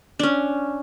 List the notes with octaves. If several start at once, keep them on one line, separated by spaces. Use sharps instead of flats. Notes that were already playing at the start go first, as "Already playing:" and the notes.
C#4 D4